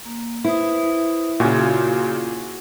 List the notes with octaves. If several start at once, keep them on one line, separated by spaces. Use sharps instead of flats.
A#3
E4 B4 C5 D#6
A#2 C#3 A#3 F4 F#4 G#5